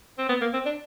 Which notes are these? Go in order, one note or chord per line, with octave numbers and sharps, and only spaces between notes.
C4
B3
A#3
C4
D4